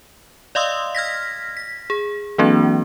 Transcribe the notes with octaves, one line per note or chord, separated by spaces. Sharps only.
D5 D#5 F5 C6 D#6 E6
F6 G#6 A#6 B6
B6
G#4
E3 F#3 A#3 C4 D4 F#4